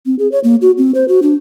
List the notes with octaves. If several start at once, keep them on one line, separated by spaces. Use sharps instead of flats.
C4
G#4
C#5
A#3
F#4
C4
C5
F#4
D4